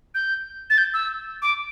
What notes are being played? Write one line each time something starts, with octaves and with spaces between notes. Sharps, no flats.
G6
A6
G6
E6
D6